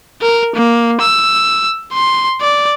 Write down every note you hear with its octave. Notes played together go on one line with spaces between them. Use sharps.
A#4
A#3
E6
C6
D5